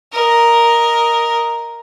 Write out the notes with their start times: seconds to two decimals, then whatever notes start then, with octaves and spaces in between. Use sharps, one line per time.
0.12 A#4 D#5